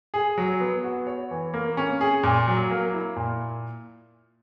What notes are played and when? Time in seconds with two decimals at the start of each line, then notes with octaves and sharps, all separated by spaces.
0.14 G#4
0.38 F#3
0.61 B3
0.84 F#4
1.07 C#5
1.31 E3
1.54 A#3
1.77 C#4
2.01 G#4
2.23 A#2
2.48 F#3
2.71 A#3
2.94 E4
3.16 A#2